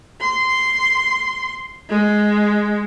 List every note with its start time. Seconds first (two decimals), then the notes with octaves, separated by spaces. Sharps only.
0.21 C6
1.89 G#3